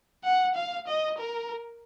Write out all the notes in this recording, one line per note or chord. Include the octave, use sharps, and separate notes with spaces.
F#5
F5
D#5
A#4